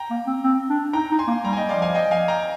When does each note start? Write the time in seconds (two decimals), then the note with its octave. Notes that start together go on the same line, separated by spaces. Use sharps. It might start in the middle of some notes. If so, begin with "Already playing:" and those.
Already playing: G5 A#5
0.11 A#3
0.27 C4
0.44 C4
0.69 D4
0.93 D#4 G5 A#5
1.11 D#4
1.19 G#5 C6
1.27 A#3
1.44 G3 G5 A#5
1.53 G#5
1.57 D#5 G5
1.69 F3 D5 F5
1.82 F5 G#5
1.95 D#5 G5
2.11 F5 G#5
2.28 G5 A#5